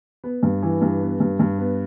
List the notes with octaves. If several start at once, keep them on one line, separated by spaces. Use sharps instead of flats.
B3
G2
E3
G2
B3
G2
G2
B3